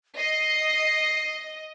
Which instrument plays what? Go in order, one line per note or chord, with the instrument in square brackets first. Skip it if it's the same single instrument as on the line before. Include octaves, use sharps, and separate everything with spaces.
[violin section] D#5 [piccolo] C7